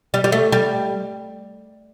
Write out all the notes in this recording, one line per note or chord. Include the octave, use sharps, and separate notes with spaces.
G3
G3
A3
G3